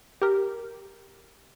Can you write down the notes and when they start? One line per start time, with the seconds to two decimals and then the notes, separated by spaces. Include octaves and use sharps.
0.22 G4 A#4